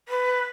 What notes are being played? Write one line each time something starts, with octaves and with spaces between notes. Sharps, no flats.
B4